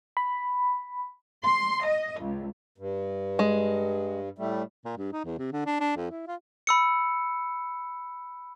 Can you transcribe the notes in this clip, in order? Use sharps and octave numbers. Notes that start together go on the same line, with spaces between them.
B5
C6
D#5
C#2
G2
G#3
A2 G3 A3
A#2
G2
D#4
E2
C3
D3
D4
D4
F2
E4
F4
B5 E6 C#7